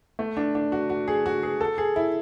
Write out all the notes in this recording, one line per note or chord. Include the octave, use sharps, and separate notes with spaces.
A3
D4
D4
F#4
F#4
G#4
F#4
G#4
A4
G#4
E4